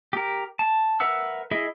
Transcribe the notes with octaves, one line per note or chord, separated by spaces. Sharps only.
G4 A#4
A5
A#4 B4 E5 F#5 E6
E4 G#4 D#5 E5